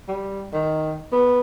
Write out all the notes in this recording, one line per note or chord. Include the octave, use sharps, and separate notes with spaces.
G3
D#3
B3